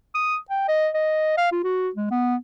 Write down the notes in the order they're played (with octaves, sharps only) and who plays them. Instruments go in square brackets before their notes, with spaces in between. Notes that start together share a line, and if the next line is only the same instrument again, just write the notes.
[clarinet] D#6
G5
D#5
D#5
F5
F4
F#4
G#3
B3